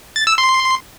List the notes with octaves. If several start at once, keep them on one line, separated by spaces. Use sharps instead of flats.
A6
E6
C6